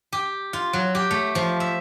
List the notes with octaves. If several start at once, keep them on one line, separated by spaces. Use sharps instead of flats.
G4
F4
F#3
G4
A3
F3
E5